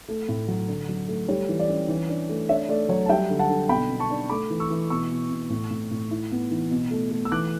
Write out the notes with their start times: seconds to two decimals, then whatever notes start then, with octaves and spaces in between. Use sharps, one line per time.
0.08 A3
0.29 A2
0.48 F#3
0.68 D3
0.89 F#3
1.08 A3
1.28 G3 C#5
1.49 E3
1.59 D5
1.69 C#4
1.88 E3
2.09 D4
2.29 A3
2.49 D4 C#5 E5
2.69 A3 D5
2.89 F#3 C#5
3.05 A5
3.09 G3 E5 G5
3.30 D3
3.39 F#5 A5
3.49 D3
3.69 B2 G5 B5
3.90 B2
4.00 A5 C#6
4.10 D4
4.29 A3 B5 D6
4.50 E3
4.60 C#6 E6
4.70 E3
4.90 B2 C#6 E6
5.11 B2
5.30 B2
5.50 A2
5.70 A2
5.91 A2
6.11 E4
6.32 B3
6.51 E3
6.71 B2
6.91 A3
7.11 A3
7.25 E6
7.32 E3 D6 F#6